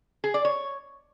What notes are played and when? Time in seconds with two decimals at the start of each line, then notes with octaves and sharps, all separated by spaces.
0.24 G#4
0.34 D5
0.45 C#5